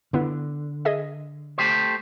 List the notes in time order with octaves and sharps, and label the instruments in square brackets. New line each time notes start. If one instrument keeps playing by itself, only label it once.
[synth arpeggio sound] G2 B3 E4 [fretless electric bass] D3
[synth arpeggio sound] G#4 D#5 E5
[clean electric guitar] A3 G4 C5